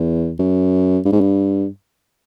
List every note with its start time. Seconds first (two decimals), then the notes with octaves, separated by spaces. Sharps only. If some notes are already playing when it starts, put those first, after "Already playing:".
Already playing: E2
0.39 F#2
1.05 G2
1.13 G#2
1.21 G2